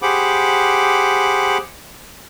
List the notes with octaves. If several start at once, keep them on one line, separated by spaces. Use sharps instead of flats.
G4 G#4 C5 F#5 B5 D6